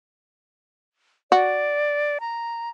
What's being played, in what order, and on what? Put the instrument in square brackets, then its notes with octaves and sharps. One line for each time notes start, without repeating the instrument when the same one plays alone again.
[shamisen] F#4 [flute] D5
[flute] A#5